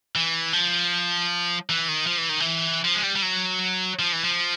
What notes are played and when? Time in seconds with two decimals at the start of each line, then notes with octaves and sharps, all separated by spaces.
0.16 E3
0.53 F3
1.69 E3
1.88 D#3
2.07 F3
2.18 E3
2.29 D#3
2.40 E3
2.84 F3
2.95 G#3
3.03 G3
3.16 G3
3.22 F#3
3.99 F3
4.13 E3
4.24 F3